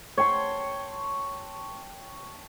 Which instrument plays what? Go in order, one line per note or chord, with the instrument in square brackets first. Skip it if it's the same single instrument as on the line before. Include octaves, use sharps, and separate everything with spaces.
[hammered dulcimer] C#5 G5 A5 C6